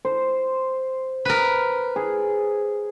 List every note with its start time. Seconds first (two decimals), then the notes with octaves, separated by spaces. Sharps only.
0.05 C5
1.25 A#4 B4
1.96 G#4